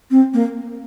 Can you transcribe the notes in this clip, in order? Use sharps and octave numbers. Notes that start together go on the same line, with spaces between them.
C4
A#3